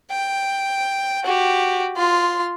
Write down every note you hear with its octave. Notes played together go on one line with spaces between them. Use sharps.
G5
F#4 G4
F4 C6